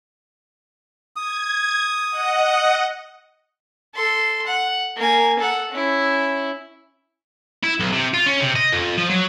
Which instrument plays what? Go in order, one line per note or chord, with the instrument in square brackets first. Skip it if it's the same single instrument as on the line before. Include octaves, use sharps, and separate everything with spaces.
[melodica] D#6 [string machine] G#6
[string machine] D#5 F#5
[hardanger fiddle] A4 C6
F#5
A#3 G#5
A4 F#5
C#4 E4
[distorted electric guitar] E4
B1
C3
F4
C#4
C3
D#5
F2
F3
F#3